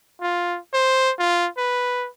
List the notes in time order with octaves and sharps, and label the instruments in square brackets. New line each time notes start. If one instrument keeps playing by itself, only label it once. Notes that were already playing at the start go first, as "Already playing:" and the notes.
[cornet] F4
C5
F4
B4